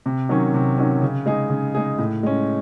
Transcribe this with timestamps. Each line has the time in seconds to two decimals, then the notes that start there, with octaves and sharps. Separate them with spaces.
0.06 C3
0.29 D#3 F#3 C#4
0.54 C3
0.78 D#3 F#3 C#4
1.02 C#3
1.26 G#3 D#4 G#4
1.50 C#3
1.75 G#3 D#4 G#4
1.99 A2
2.23 G#3 C#4